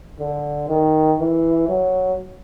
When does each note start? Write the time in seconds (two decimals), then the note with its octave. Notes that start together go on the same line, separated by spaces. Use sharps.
0.20 D3
0.69 D#3
1.19 E3
1.69 F#3